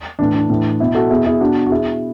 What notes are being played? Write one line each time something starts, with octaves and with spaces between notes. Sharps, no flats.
A2 E3 D4
D4
A2 E3
B2 E4
F#4 A4
B2 E4 G#4
E4 G#4
B2 D4 F#4
F#4
B2 E4 G#4